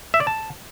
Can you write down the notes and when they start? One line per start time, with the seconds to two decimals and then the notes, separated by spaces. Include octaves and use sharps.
0.14 E5
0.20 D5
0.27 A5